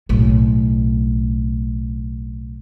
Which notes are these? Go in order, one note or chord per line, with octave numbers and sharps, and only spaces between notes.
B1 A2